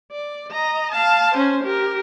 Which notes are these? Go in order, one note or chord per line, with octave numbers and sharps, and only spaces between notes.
D5
D#5 A#5
F5 A5
C#4 C5
G4 A#4